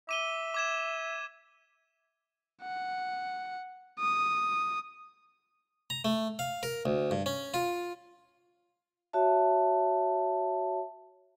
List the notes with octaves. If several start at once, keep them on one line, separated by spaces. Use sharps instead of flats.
E5 D6 D#7 G7
D6 G#6 E7
F#5
D#6
A#5
A3
F5
A#4
D2
G2
C#4
F4
F#4 C#5 E5 A5